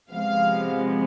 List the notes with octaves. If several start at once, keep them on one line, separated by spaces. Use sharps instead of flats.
C3 F3 G#3 B3 F5